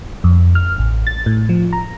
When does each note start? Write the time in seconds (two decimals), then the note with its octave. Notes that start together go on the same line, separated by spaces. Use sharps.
0.24 F2
0.55 F6
0.78 A1
1.07 A6
1.26 A2
1.49 F3
1.73 A#5